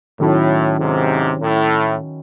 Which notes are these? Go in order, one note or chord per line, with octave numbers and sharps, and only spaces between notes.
A2 D#3 F#3 C#4 E4 A4
G#2 C3
A2